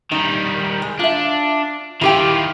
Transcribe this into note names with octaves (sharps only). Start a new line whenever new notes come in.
D#3 G3 D#4
G#3
D4 F4 E5
D#3 E4 F4 G4 G5